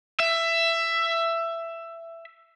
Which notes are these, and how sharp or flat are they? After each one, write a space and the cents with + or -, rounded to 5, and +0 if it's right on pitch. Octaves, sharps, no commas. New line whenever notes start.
E5 +15